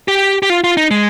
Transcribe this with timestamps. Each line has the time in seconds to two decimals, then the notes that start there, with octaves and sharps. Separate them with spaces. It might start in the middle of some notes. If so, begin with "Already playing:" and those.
0.08 G4
0.43 G4
0.50 F4
0.64 F4
0.77 D#4
0.91 G#3